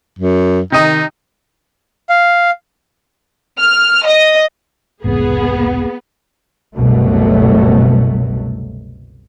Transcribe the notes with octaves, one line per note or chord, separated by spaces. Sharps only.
F#2
C3 D#3 D#4 D#5
F5
F6
D#5
E1 C2 G#2 B3 G#4
F#1 C2 B2 F#3 A3